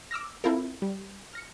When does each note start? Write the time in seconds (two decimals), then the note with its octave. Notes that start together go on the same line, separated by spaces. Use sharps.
0.11 D6 E6 F6 A#6
0.44 C4 E4 F4 A4 A#4
0.82 G3
1.33 F6 A#6 C#7